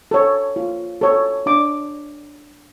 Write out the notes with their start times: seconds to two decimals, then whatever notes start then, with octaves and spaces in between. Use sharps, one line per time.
0.11 A4 C#5
0.56 F4
1.01 A4 C#5
1.46 D4 D6